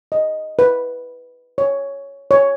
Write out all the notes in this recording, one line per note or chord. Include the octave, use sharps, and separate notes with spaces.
D#5
B4
C#5
C#5